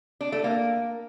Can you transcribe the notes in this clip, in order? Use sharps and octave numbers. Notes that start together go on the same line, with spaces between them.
D4
A3
A#3